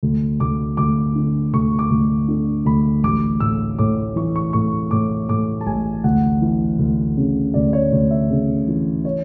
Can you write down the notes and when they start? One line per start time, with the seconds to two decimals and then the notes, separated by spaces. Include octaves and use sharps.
0.03 D2
0.40 D2 D6
0.77 D2 D6
1.15 D3
1.54 D2 C#6
1.79 D6
1.90 D2
2.28 D3
2.65 D2 B5
3.03 A1 D6
3.40 A2 E6
3.79 A2 D6
4.16 E3 C#6
4.36 C#6
4.53 A2 C#6
4.91 A2 D6
5.29 A2 D6
5.61 A5
5.66 A1 G#5
6.04 D2 F#5
6.42 E3
6.79 D2
7.17 C#3
7.54 D2 D5
7.73 C#5
7.92 D2
8.11 E5
8.30 C#3
8.68 E3
9.05 C#5